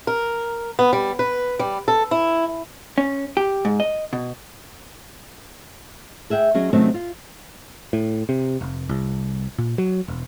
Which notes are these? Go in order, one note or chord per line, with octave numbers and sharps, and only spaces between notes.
A#4
B3
G3
B4
G3
A4
E4
C#4
G4
G#2
D#5
B2
G#4 E5 F#5 G5
F#3 C#4 G#4 D#5
C3 D#3 F#3 A3 C4 C#4
F4
A2
C3
F1
C2
A#2
F#3
E1